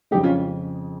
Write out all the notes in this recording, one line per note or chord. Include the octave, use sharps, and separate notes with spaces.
F2 C#3 G#3 D#4 G4
C#4 F4